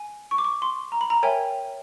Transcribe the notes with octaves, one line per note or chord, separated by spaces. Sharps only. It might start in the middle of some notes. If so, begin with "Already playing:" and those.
Already playing: G#5
C#6
D6
C#6
C6
A#5
B5
A#5
A#4 C#5 E5 G5 G#5